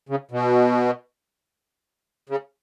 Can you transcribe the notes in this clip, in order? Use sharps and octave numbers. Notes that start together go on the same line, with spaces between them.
C#3
B2
C#3